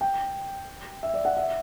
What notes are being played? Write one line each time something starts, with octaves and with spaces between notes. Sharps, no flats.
G5
E5
D5
F#5
E5